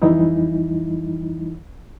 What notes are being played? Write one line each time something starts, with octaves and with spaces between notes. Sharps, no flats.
F2 E3 G3 D#4 E4